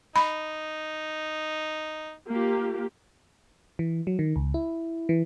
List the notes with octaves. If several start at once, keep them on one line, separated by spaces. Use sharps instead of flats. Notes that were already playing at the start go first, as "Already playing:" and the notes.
D#4 B5
A#3 F4 G4
E3
F#3
D#3
C#2
E4
E3